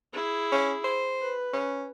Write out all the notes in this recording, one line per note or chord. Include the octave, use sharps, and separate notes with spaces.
E4 G#4
C#4
C5
B4
C#4